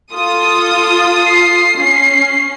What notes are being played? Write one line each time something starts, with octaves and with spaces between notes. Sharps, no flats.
F4 A4 D#6
C7
C#4